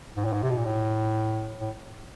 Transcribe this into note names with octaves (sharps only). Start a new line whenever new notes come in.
G#2
A2
G#2
C3
B2
A#2
A2
A2